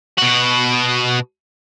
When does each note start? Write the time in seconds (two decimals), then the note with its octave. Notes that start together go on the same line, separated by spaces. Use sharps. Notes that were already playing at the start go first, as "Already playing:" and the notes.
0.18 B2 F#4